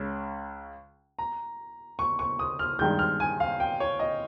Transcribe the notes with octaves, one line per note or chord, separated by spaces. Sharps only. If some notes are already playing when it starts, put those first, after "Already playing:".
Already playing: C#2 C#3 C#4
A#5
C#6
C#6
D#6
F6
G2 D#3 G#3 G6
F6
G#5
F5
G5
C#5
D#5